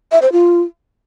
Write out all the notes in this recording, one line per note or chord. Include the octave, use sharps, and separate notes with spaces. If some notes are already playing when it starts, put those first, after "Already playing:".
E5
C5
F4